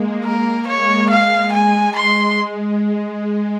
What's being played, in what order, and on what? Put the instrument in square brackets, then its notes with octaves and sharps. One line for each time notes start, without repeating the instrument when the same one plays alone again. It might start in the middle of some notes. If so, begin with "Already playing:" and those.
Already playing: [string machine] G#3 A#3
[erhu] A#4
[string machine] G#3 [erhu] C#5
[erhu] F5
G#5
[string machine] G#3 [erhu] C6